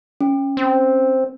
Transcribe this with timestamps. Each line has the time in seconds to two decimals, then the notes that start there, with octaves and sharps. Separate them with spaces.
0.21 C#4
0.57 C4